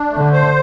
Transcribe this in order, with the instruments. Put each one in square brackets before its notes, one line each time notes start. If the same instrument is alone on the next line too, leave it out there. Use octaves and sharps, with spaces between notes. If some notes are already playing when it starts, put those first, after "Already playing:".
Already playing: [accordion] D4
A3
[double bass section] D3
[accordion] C5